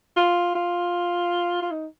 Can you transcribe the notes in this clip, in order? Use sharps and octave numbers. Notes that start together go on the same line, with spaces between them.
F4
F4
F4
D#4